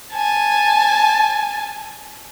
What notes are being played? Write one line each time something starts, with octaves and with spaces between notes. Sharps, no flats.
G#5 A5